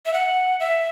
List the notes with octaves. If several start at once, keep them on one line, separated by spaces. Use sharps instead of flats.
E5
F#5
E5